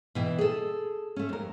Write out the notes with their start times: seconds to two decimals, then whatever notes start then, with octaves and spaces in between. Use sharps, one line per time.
0.15 B2 E3 G5
0.38 G#4 A4
1.16 A3 C#4
1.29 F2 A#4